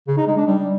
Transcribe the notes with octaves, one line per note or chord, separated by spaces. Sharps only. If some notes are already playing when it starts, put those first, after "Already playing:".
C#3
D#4
G#3
D4
G3